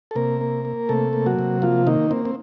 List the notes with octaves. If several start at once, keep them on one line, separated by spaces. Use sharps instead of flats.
A4
C3 A#3 A#4
A#3
A#3
C3 A3 A4
A#3
F#3 F#4
C3
F3 A#3 F4
D#3 A#3 D#4
A#3 C4
C4